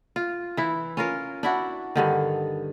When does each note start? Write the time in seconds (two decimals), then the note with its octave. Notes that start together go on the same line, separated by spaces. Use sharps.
0.16 F4
0.57 E3 E4
0.97 C#4 F4 A#4
1.43 D4 E4 F#4
1.95 G2 D3 D#3